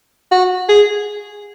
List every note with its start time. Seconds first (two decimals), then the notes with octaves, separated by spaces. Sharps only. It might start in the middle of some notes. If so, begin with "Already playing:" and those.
0.31 F#4
0.69 G#4